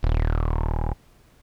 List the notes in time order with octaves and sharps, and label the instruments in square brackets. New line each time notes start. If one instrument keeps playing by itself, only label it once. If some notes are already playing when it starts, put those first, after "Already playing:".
[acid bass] D#1